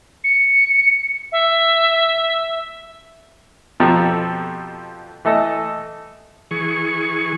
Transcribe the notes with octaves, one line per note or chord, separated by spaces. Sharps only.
C#7
E5
F2 B2 F3 G4 A4 A#5
E3 A3 A4 D#5
E3 G#4 C#6